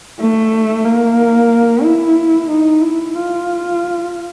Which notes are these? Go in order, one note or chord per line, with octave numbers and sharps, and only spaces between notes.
A3
A#3
E4
D#4
E4
F4